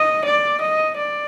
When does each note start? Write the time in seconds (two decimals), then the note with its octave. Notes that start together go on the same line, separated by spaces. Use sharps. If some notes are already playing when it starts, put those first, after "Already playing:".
Already playing: D#5
0.25 D5
0.61 D#5
0.97 D5